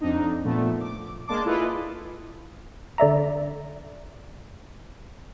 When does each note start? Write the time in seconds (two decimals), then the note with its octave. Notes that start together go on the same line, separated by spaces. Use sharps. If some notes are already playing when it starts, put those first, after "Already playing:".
0.01 F2 C4 D4 D#4
0.44 A#2 F3 A3 B3
0.80 D6
1.27 G#3 A#3 D4 A5 C6 D6
1.45 E4 F4 G#4 A4 B4 D#5
2.98 D3 D5 E5 A#5